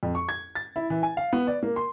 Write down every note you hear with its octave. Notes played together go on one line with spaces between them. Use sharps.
F2
C#6
G#6
A6
E4
E3
G#5
F5
B3
D5
A#3
C6